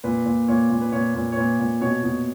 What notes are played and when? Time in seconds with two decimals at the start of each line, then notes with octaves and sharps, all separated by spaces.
0.04 A#2 B4
0.26 A#2
0.48 A#2 C#5
0.70 A#2
0.81 B4
0.92 A#2 C#5
1.15 A#2
1.32 C#5
1.37 A#2 B4
1.59 A#2
1.81 B2 C#5
2.03 B2